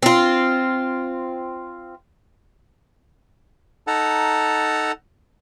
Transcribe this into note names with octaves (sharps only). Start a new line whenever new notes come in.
C4 F4
D#4 A4 F#5 A5 A#5